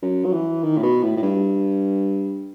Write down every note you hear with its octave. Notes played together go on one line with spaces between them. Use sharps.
F#2
F#3
E3
D#3
A2
B2
A2
A2
G2